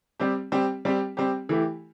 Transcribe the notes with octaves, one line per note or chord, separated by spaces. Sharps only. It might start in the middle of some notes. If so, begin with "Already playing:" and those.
G3 C4 G4
G3 C4 G4
G3 C4 G4
G3 C4 G4
E3 A3 E4 G4